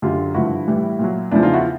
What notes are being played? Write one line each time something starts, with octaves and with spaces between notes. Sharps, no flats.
F#2 D3 F#3 F4 G4
G2 D3 F3 E4 F#4
A2 E3 G3
A#2 F#3
E2 C#3 F3 D4 E4
D#4 F4
E4 F#4